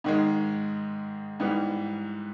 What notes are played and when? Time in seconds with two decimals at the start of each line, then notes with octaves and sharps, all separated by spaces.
0.04 G#2 D#3 G#3
1.40 G#2 E3 G3 B3